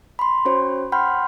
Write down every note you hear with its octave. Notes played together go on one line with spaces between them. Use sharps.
B5 C6
C#4 F#4 C5 C#5
F#5 G5 B5 C6 F6 G6